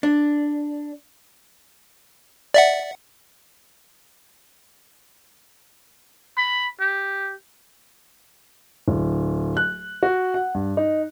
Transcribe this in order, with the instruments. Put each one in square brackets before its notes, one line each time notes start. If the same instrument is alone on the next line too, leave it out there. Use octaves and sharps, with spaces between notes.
[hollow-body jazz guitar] D4
[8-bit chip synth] D5 E5 F#5
[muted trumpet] B5
G4
[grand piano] D1
F#6
F#4
F#5
G2
D#4